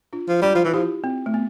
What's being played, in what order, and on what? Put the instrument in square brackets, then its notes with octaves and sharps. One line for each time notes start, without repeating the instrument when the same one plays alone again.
[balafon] D4 F4
[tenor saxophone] F3
[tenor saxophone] G3 [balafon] D4 F4
[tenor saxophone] F3
[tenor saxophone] E3 [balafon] F4
[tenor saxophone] F3 [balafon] E4 G4
[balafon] C4
A3
B3